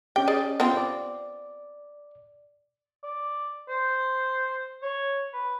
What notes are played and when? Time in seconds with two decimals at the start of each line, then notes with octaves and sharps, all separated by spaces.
0.16 C#4 G4 G5
0.27 G#4 D5 D#5
0.60 B3 C4 F4
0.77 D5
3.03 D5
3.69 C5
4.82 C#5
5.33 B4